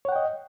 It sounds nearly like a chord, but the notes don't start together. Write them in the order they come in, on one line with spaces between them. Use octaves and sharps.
C#5 F#5 G5 D#5